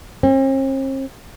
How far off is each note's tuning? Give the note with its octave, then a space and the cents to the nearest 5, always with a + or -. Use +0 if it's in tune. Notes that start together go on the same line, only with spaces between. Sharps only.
C4 +45